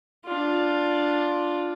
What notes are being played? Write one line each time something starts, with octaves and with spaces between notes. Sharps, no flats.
D4 F4